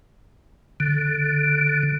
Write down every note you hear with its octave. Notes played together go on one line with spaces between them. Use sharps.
D3